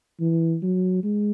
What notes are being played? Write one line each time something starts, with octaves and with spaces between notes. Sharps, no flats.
E3
F#3
G#3